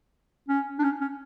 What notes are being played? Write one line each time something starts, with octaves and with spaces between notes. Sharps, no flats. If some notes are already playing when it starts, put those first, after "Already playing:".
C#4
D4
C#4
C#4